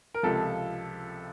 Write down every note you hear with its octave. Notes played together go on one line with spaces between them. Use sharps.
A#4
C#2 C3 F3 A4